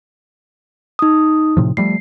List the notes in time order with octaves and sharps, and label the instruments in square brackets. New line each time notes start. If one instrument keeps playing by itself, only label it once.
[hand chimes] D#4 D#6
[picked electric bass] A2 C3 F3
[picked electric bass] F3 G3 A3 [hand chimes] C7